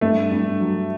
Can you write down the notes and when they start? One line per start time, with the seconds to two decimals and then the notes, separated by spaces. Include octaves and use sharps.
0.01 G2 A3
0.31 G2
0.60 F#3